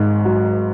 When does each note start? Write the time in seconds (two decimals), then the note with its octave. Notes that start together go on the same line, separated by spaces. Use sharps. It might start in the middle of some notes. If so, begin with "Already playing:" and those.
Already playing: G#1 G#2
0.25 F#3